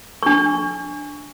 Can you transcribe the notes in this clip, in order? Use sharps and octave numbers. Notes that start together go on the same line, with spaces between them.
D4 C#6